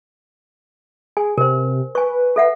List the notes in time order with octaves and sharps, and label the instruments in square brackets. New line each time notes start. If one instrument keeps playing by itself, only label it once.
[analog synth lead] G#4 [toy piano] G#5
[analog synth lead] C3 [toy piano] A#4 C5
[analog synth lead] B4 [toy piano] G#5 C#6
[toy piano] A4 E5 F#5